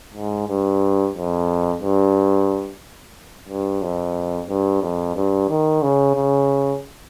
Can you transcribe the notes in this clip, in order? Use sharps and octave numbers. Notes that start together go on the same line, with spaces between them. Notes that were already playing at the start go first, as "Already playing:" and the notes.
G#2
G2
F2
G2
G2
F2
G2
F2
G2
D#3
C#3
C#3